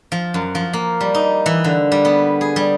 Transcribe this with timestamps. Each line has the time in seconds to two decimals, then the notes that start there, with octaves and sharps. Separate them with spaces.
0.12 F3
0.34 F#2
0.55 F3
0.73 A#3
1.01 G3
1.14 D#4
1.46 E3
1.64 D3
1.92 G3
2.05 B3
2.41 G#4
2.56 G3